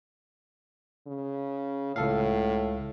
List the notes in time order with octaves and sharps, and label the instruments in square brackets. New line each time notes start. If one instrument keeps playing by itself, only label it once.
[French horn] C#3
[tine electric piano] C#2 A4 F5 [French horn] A2